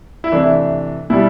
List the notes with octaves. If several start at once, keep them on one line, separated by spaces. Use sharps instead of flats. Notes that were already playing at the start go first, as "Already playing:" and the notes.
E4
C3 E3 A3 D4
B2 G3 E4